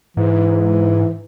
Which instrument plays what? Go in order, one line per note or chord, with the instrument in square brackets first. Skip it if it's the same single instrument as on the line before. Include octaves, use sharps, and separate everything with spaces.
[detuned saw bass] G#2 [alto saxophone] E3